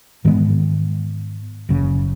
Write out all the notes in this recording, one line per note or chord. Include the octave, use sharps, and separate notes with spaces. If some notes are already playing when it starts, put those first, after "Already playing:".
G#2 D#3 G#3 B3
F#1 F#2 C#3